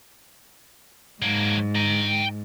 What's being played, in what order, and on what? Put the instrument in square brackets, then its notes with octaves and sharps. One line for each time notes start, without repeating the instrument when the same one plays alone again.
[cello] G#2 [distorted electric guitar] F#3 A#3
[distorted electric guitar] G5 A#5